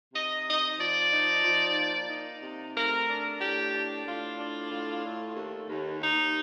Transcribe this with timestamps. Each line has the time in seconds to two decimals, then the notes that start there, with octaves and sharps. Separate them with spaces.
0.14 C3 D#5
0.47 D#4 D#5
0.78 F3 D5
1.12 D#4
1.44 F3
1.77 A#3
2.10 D#4
2.42 C3
2.75 A3 A#4
3.08 D4
3.40 A2 G4
3.73 D4
4.05 A2 F4
4.38 D4
4.71 A2
5.03 A3
5.35 D#2
5.68 D#2
6.01 D#2 D#4